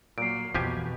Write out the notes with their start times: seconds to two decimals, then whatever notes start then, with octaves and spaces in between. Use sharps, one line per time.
0.18 A#2 F#3 A#3 C7 D7
0.55 F2 B2 E3 F3 B3 G4 G#5